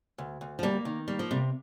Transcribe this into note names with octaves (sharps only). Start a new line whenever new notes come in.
D2
D2
F3
G3 A#3
D#3
G3 A#3
F3
C3 G3